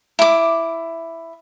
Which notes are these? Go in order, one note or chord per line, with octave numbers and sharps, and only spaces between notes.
E4 D6